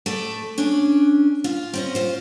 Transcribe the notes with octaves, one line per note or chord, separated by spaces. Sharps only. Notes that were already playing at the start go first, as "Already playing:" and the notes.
A3 A4 D5
C#4 D4
F4
C4 C#4 D#5
F4 C5